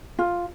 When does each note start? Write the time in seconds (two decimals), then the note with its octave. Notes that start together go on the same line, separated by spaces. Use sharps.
0.19 F4